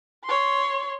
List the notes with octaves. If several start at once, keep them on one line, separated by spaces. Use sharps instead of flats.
C#5 C6